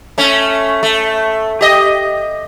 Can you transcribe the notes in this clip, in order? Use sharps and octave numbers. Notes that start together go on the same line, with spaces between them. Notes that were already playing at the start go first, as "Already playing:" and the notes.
A3 C#4
A3
G4 D#5